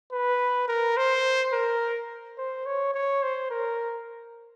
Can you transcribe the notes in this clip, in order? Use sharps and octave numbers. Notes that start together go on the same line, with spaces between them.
B4
A#4
C5
A#4
C5
C#5
C#5
C5
A#4